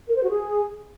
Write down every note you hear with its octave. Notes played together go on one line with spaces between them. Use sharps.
A#4
C5
F#4
G#4